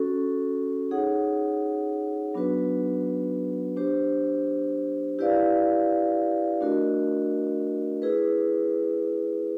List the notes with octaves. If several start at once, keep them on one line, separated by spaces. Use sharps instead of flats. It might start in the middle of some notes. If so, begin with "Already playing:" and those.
Already playing: C#4 F#4 A4
D#4 G#4 C#5 F#5
F#3 B3 D4 F#4 B4
D4 G4 C5
E4 G4 B4 D5 F5
A3 D4 F#4 A#4 D#5
E4 G#4 B4